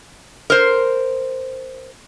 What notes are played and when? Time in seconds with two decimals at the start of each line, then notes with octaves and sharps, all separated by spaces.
0.50 A#4 C5